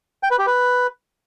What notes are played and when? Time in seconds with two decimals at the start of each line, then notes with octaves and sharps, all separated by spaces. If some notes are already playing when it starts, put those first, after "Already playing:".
0.23 G5
0.31 B4
0.39 G4
0.47 B4